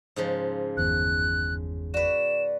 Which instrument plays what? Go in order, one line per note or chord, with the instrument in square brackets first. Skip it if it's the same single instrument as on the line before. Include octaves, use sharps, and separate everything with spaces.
[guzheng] G#2 C#3 F3
[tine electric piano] G1 E2 [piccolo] F#6
[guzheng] F#4 B4 [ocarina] D5 [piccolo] E7